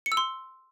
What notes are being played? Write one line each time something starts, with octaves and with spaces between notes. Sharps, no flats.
C#7
E6
C6